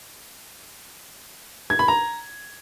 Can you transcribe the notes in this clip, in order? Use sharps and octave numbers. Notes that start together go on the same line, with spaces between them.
G#6
B5
A#5